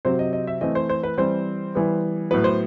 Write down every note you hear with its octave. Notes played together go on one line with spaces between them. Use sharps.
C3 F#3 C4 C5
D#5
D#5
E5
E3 A3 C4 D#5
C5
C5
B4
E3 G3 C4 C5
E3 G3 B3
A2 F#3 B3 B4
C5